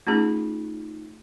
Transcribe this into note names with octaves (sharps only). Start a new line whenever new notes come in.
A3 C#4 D#4 F4 G#4